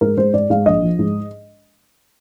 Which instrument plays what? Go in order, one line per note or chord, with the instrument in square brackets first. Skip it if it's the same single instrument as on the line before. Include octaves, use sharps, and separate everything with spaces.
[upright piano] G#2 A#4
G#2 C5
G#2 D5
G#2 F5
A#1 D#5
F3
G#2